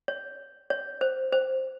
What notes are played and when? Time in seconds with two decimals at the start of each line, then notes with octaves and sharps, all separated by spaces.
0.08 C#5
0.70 C#5
1.01 C5
1.32 C5